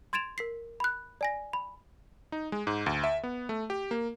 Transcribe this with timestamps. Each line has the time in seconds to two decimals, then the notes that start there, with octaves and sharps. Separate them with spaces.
0.13 C6 G#6 A6 D7 E7 F7
0.38 A#4 B6 C7
0.80 B5 F#6
1.21 D5 G#5 A#6
1.53 B5
2.32 D#4
2.52 G#3
2.67 G#2
2.86 D2
3.04 E5
3.23 B3
3.49 A3
3.70 G4
3.91 A#3